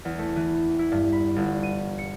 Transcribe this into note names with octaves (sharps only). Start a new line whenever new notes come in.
E2
A3
E3
E4
G2
B5
G1
D#7
C#7